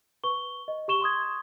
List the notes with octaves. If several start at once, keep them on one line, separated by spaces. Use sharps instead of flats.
B4 C#6 G7
D#5
G4 C#6 E7 G7
C6 C#6 D#6 G#6